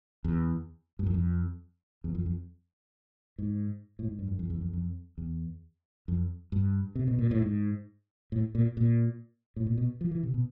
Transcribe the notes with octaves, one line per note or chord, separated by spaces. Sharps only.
E2
G2
F#2
F2
E2
F2
F2
G#2
A2
G#2
G2
F#2
F2
E2
F2
F2
E2
F2
G2
C3
B2
A#2
A2
G#2
A2
A#2
A#2
A2
A#2
B2
F3
E3
C3
B2